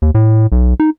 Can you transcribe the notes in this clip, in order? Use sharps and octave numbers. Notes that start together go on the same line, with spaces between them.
D#2
A2
B1
D#4